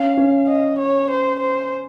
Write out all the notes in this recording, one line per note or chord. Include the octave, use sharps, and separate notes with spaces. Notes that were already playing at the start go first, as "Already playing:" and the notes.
Already playing: C#4 F5
C#4
D#5
C#5
C5
C5